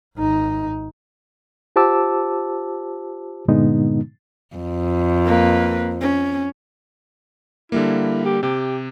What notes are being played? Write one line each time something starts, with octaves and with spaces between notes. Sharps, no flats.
G#1 D#4
F4 G4 C5 A5 D6 E6
G2 A#2 D3 G#3 B3 D#4
F2
A#3 B4
C#4
D3 G3 A#3 E4
G4
C3 G4